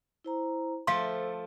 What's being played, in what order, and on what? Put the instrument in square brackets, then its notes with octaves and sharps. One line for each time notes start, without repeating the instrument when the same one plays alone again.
[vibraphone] E4 C5 A#5
[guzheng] F3 A3 A4 [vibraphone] C5 [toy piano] F5 C6